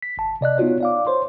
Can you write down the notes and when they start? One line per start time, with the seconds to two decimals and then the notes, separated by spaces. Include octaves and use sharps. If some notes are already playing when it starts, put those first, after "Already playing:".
0.02 B6
0.17 G1 A5
0.41 C3 D5 D#5 F#6
0.58 B3 D#4 F4 F#4 C#5
0.81 D5 F5 D6
1.07 C5 C#5 C6